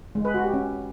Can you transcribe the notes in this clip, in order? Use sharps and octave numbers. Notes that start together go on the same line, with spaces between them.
G#3
B4
F#4
G4
C#4